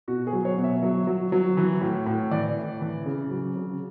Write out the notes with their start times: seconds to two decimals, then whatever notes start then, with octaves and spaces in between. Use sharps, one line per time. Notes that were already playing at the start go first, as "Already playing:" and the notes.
0.08 B2 F#4
0.27 G#4
0.33 F#3
0.45 C#5
0.58 B2
0.64 E5
0.83 F#3
1.07 F#3
1.32 F#3
1.57 E3
1.81 A2
2.06 A2
2.31 E3 D5
2.56 A2
2.81 E3
3.06 C#3
3.30 F#3
3.55 C#3